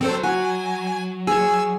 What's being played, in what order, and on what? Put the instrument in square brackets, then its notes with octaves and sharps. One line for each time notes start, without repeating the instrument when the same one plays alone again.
[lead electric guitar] F#3 [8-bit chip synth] C4 A4 C5
[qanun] F#4 [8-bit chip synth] G#5
[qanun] G#4 C#5 [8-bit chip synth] G#5 E6